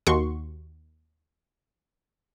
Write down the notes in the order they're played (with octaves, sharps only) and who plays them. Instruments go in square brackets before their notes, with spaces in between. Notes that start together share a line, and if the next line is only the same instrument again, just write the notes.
[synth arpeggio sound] D#2 F#4 C6 C#6